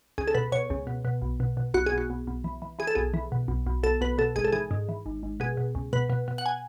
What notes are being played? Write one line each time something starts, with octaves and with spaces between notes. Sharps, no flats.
C#2 G#4
A4
B2 B4
B2 C#5
C#2
B2
B2
B1
B2
B2
B1 F#4
G#4
B1
F#4
B1
B1
E3
E3
E3 G#4
A4
B1 G#4
E3
B2
B1
B1
B1 A4
B1 B4
B2 A4
G#1 G#4
A4
E3 G#4
G#2
E3
G#1
G#1
B2 G#4
B2
C#2
B2 B4
B2
B2
F#5
G#5